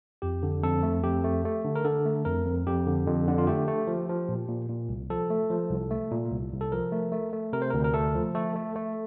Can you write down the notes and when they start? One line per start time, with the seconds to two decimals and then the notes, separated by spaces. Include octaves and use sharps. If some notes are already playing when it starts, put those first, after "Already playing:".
0.22 F2 G4
0.43 D3
0.63 F2 A4
0.83 A3
1.03 F2 G4
1.24 A3
1.45 A3
1.65 D3
1.75 A#4
1.84 D3 A4
2.05 A3
2.25 F2 A#4
2.46 F2
2.66 F2 G4
2.86 D3
3.07 F2
3.27 D3
3.38 F4
3.47 A3 G4
3.68 A3
3.87 F3
4.09 F3
4.29 A#2
4.48 A#2
4.69 A#2
4.89 C2
5.10 F3 A4
5.30 A3
5.50 F3
5.70 C2
5.91 A3
6.12 A#2
6.32 C2
6.52 C2
6.61 A4
6.72 F3 A#4
6.92 A3
7.12 A3
7.33 A3
7.53 C3 A#4
7.62 C5
7.70 D2 A#4
7.84 A#4
7.94 A3 A4
8.15 F3
8.35 A3 A4
8.55 A3
8.76 A3